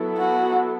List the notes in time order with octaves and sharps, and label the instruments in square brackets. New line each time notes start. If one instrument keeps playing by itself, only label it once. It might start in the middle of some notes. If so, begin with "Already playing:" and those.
Already playing: [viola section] F#3 B3 E4 A4
[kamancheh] F#4